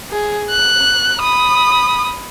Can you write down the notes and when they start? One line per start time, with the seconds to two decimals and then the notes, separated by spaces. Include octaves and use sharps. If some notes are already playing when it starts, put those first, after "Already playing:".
0.11 G#4
0.51 F#6
1.19 B5 D#6